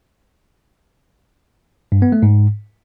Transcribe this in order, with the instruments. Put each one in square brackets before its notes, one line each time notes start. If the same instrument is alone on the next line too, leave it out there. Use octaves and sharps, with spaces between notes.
[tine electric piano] G2
B3
A3
G#2